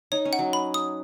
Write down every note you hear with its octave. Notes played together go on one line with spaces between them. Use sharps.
D#4 C#5
C#4
F#5
F#3
B5
D#6